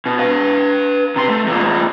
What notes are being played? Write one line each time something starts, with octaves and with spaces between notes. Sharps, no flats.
B2
B4 F5
C3 C6
A3
E2 A#2